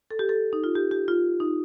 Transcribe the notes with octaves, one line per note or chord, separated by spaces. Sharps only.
A4
G4
A4
D#4
F4
G4
G4
F4
D#4